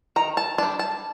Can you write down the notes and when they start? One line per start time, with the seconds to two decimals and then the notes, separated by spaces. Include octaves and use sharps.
0.16 D#3 A#5
0.37 A5
0.58 G3 D4 A5
0.79 A5